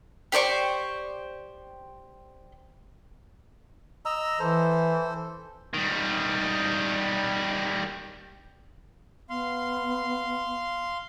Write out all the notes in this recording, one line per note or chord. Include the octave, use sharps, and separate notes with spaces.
G4 C5 D5 C#6
D#5 A#5 E6
E3 A4 C5
D#3 G3
B3 F5 C6